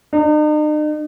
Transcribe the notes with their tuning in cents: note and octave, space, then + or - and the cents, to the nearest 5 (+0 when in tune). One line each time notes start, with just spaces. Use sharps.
D#4 -45